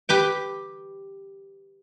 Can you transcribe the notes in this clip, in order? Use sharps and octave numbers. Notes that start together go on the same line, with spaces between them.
G4 B4 G5